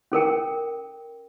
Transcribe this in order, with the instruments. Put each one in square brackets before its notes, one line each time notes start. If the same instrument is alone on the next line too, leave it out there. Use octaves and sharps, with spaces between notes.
[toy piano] C#4 A4 A#4 G5